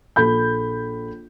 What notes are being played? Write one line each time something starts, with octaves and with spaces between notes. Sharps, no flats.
A#1 A4 B5 G6